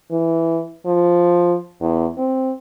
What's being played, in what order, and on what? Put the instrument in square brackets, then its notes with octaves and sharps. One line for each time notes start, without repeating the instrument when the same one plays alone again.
[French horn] E3
F3
E2
C4